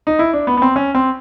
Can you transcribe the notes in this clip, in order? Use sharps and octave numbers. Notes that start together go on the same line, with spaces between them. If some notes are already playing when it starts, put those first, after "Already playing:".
D#4
E4
D4
B3
B3
C4
C#4
C4